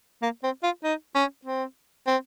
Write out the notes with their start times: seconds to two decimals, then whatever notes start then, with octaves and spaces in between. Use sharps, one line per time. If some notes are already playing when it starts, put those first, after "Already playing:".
0.22 A#3
0.44 C4
0.63 F4
0.84 D#4
1.15 C#4
1.45 C4
2.07 C4